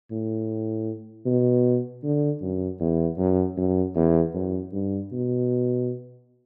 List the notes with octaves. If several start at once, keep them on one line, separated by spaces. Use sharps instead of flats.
A2
B2
D3
F#2
E2
F#2
F#2
E2
F#2
G2
B2